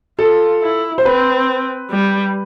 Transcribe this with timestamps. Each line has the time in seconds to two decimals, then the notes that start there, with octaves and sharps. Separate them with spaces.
0.19 F4 A4
0.63 E4
0.98 C5
1.05 C4 B4
1.91 G3